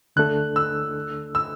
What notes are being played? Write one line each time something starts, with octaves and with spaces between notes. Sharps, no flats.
D2 D3 A3 D4 A4 F#6
E6
E6